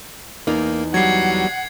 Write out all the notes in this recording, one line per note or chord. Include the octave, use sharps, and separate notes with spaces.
E2 A#3 D#4
F#3 G3 F#5 G#6 C7